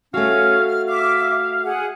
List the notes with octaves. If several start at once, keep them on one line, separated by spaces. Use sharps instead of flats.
A3 C#4 F#4 F5
F6
E5 F5 D6
G#4 F#5